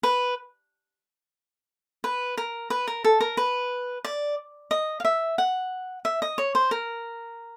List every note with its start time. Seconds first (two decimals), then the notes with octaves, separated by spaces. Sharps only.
0.03 B4
2.04 B4
2.38 A#4
2.70 B4
2.88 A#4
3.04 A4
3.21 A#4
3.37 B4
4.05 D5
4.71 D#5
5.00 F5
5.05 E5
5.38 F#5
6.05 E5
6.22 D#5
6.38 C#5
6.55 C5
6.71 A#4